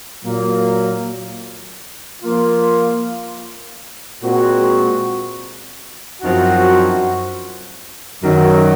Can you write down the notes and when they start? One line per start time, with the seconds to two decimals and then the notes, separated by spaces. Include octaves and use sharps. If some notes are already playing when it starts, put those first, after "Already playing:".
0.24 A#2 F#3 A#3
2.23 F3 A#3 F4
4.22 A#2 G#3 C4 F#4
6.22 F#2 F3 C4 D#4 F#4
8.22 F#2 D#3 F#3